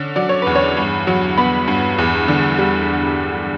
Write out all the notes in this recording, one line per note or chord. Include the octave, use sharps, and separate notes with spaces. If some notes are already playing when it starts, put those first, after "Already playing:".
Already playing: D3 C#4
F#3 D5
C#5
E2 B4
C#5
G2
F#3
B3 B5
G2
E2
D3
G3